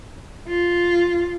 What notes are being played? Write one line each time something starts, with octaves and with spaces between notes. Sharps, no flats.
F4